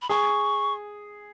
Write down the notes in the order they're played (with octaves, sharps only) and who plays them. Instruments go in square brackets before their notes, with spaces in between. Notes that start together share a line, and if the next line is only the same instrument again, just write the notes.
[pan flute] B5
[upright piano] G#4 [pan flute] C#6